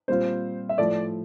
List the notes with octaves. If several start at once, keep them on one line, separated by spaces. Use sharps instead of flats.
A#2 G3 C4 F4 C5
E5
A2 F3 A3 D5